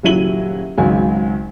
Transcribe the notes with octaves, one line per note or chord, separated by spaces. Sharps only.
D#1 C#3 F#3 E4 D#7 F#7
G#1 C#2 F#3 G#5